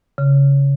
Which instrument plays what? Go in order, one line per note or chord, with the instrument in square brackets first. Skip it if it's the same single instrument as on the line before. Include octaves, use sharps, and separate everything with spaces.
[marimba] C#3